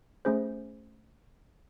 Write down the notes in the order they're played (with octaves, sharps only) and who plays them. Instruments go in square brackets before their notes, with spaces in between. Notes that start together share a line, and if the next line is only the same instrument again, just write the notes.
[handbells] A3 C#4 G#4 C5